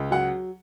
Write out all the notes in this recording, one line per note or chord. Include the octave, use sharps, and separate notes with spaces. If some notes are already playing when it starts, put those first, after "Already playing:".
Already playing: C#2
F#3 F#5